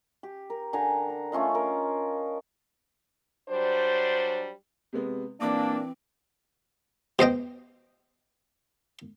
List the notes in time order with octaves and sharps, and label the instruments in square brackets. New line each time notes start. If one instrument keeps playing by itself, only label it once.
[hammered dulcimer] G4
A#4
D3 G5 G#5 A#5
A#5
A3 C#4 F4 D#5
A#4
[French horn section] F#3 G3 D4 C5
[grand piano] C3 G#3 B3
[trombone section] A#2 D4 [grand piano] E3 D6 D7 [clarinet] A#3 [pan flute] C4
[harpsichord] B2 C5 D#5 G5